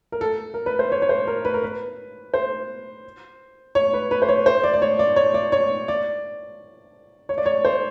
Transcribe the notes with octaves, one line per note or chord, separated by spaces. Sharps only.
A#4
A4
A#4
B4
C5
C#5
C#5
C5
A#4
B4
A#4
B4
C5
C#5
B4
B4
C5
C#5
C5
D5
D5
C#5
D5
C#5
D5
C#5
D5
C#5
D5
C#5
C5